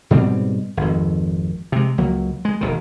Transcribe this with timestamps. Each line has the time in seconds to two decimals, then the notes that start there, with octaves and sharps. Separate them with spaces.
0.11 G#2 B2 G3 C4
0.77 G#1 F2
1.72 C3 G#3
1.98 C#2 F#3 A#3
2.45 G#3
2.61 E1 D#2 D#3